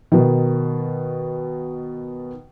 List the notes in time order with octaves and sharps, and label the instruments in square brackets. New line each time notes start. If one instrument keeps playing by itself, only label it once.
[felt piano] B2 D#3